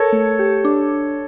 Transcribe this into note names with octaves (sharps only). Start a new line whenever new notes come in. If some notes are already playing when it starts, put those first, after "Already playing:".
Already playing: A4 A#4 C#5
A3
G4
D4